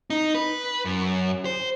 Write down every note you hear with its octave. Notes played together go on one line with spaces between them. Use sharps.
D#4
B4
F#2
C5